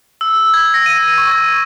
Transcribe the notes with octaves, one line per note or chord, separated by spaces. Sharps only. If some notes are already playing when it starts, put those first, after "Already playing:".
E6
G#6
A#6
D#7
C#6
G#6